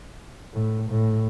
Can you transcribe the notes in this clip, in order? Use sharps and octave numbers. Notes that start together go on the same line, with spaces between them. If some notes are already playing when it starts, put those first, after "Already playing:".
A2
A2